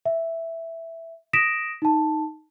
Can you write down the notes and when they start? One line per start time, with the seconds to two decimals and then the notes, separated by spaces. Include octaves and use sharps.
0.06 E5
1.33 D#6 A#6 B6 D7 E7
1.82 D#4 A5